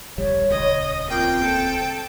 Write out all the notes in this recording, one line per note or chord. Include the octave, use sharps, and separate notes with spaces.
D1 A#1 G3 C#5
D#1 C#2 D#5
A#3 C4 F4 G5
A4 A5